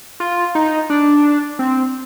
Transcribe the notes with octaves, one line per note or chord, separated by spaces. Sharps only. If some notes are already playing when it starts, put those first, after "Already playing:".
F4
D#4
D4
C4